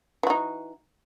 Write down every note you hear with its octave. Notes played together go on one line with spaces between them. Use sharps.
E3 D#4 F#4